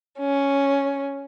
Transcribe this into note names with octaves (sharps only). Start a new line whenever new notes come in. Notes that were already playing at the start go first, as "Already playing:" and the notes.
C#4